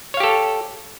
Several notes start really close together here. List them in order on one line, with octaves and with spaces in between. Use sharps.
C#5 F5 G4 A4